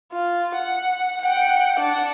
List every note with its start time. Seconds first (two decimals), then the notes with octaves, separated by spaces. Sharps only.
0.12 F4
0.55 F#5
1.21 F#5 G5
1.80 D4 F#5